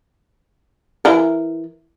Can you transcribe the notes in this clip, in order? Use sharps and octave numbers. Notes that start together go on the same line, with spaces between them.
E3 A#4